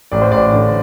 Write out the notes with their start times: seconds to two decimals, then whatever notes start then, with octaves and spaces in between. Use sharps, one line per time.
0.12 A1 D5
0.22 C5
0.32 A1 D5
0.53 D3